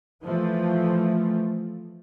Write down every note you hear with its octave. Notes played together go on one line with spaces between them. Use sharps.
E3 F3 A3